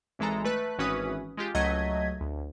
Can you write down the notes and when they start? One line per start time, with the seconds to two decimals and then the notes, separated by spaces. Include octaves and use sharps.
0.19 G#1 E3 G#3 A4 A#5
0.44 A3 B4 F#6
0.78 G#1 E3 C#4 F#4 B4 D#6
1.37 G#3 F4 G4
1.55 C#2 F#3 A3 D#5 G#6 B6
2.21 D2